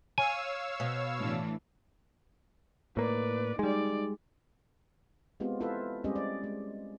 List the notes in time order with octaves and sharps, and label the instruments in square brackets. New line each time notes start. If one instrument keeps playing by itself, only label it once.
[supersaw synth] C#5 F5 E6 [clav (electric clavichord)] G#5
[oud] B2
[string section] A2 E3 D4
[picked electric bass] A2 A#3 [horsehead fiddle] B4 D5
[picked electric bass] G3 G#3 [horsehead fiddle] D#4 D5
[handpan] G#3 B3 C4 F4 G4
E4 F4 A4 B4 C5 E5
G3 G#3 C4 C#4 G4 D#5
D5
G#3